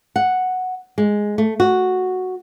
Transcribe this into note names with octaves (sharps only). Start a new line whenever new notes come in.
F#5
G#3
A3
F#4